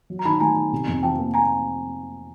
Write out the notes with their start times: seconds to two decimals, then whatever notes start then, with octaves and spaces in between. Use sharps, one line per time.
0.10 F#3
0.19 A#5
0.25 D#3 A5 B5
0.40 A3 G#5 A#5
0.56 D#3
0.72 C3
0.88 F2
1.03 F3 G5 A5
1.19 A#3
1.34 G#5 A#5